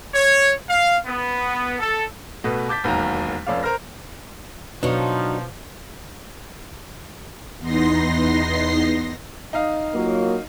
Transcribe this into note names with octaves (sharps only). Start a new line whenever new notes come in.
C#5
F5
B3
A4
B2 A3 B4
A5 D6 G6 A6 B6
E1 D#2 F#3 A#5
F1 F2 C#4 D5 F5
A#4 C5 F6 A#6
B2 F3 F#3 D4 D#4 C#5
E2 B3 D#4 C6 A#6 C7
D#4 F5
F#3 A#3 F4